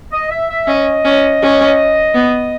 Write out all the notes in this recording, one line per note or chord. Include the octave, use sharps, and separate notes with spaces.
D#5
E5
E5
C#4 D#5
C#4
C#4
B3